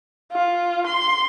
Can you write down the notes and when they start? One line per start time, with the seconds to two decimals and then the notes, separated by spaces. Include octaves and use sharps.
0.32 F4
0.86 C6